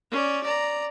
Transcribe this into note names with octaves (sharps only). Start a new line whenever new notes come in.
C#4 D5
D5 A#5